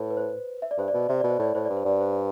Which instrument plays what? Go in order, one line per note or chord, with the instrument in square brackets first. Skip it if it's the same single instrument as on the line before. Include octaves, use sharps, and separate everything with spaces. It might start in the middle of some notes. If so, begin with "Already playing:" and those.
Already playing: [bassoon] A2 [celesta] B4
[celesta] B4
C5
E5
D5
[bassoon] G2 [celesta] C5
[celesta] D5
[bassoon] B2
[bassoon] C3 [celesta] E5
[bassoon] B2 [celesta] D5
[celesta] C5
[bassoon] A2 [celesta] D5
[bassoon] A2 [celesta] C5
[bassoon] G2 [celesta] D5
[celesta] C5
[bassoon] G2 [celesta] D5
[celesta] C5
D5